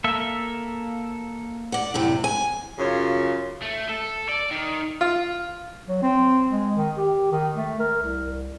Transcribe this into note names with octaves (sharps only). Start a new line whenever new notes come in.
A#3 A4 E5
D5 F#5
F#2 A2 C3
G#5
F#2 C#3 F4 C#5
A3
A4
D5
D#3
F4
F#3
C4
G#3
D#3
G4
D#3
A3
A#4
C2